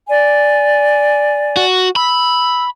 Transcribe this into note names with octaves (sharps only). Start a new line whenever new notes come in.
D5 G#5
F#4
B5 E6